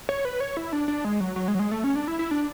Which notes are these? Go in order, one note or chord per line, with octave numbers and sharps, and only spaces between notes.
C#5
B4
C#5
E4
D4
D4
G#3
F#3
F#3
G#3
F#3
G#3
A3
C#4
D4
E4
E4
D4